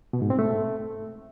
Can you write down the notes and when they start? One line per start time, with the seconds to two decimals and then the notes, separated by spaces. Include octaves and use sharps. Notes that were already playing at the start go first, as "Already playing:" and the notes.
0.13 B2
0.22 G#2
0.30 C4
0.39 A3